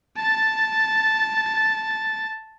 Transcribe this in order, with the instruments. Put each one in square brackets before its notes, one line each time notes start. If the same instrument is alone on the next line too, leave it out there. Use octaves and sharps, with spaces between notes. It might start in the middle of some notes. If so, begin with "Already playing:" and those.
[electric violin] A5 A6